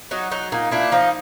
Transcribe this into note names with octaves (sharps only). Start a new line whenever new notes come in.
F#3 D#4
F#3 D#4
A#2 D#4
A#2 D4 E4
F3 D#4